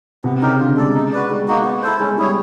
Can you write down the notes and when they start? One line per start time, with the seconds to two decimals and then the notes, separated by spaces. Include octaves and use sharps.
0.24 C3 B3
0.41 C#3 D#4 G4 A#4
0.60 D3 F4
0.77 G#3 A4 D5
0.95 D#4
1.12 F#4 B4 D5
1.30 G3 G#3
1.48 A#3 D#4 F#4
1.64 B3
1.82 E4 A4 C5
2.00 G#3 C#4
2.18 G3 E4 G#4 C#5